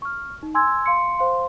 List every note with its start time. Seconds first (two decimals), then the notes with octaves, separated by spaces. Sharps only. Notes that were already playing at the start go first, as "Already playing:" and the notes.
0.02 C#6 F6
0.43 D#4
0.55 G#5 C6 E6 G#6
0.86 F5 C6 C#7
1.19 C5 F5 C6